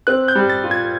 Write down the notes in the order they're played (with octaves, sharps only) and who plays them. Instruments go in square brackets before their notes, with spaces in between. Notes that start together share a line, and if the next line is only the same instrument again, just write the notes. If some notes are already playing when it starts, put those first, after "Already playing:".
[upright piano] C4 [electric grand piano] F#6
[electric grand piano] G6
[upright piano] G3
[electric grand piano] A6
[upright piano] F4
[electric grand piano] G#6